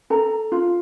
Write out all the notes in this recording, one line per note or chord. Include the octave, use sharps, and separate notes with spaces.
A4 A#5
F4